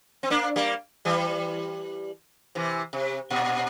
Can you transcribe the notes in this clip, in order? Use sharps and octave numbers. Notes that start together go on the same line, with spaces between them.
C4
A#3 D4
G3 A#3
E3 G3
C3 E3
C3
A#2